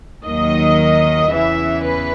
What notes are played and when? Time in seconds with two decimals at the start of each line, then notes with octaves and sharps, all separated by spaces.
0.24 D#2 D#3 F#3 D#5
1.31 E2 C#3 E3 E5
1.84 B4